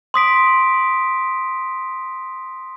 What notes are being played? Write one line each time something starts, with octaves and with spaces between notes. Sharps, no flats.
C6 D#6 B6 D7